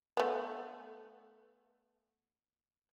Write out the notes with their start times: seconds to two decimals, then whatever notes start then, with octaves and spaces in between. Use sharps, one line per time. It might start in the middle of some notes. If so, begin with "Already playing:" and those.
0.17 A3 B3